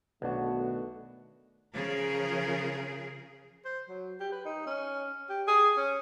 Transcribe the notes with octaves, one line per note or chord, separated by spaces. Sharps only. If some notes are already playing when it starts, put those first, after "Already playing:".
B1 B2 D#3 A3 B3 D4 F#4
C#3 F3 G#4 A#4
C5
F#3
G4
B4
D#4
C#4
G4
G#4
C#4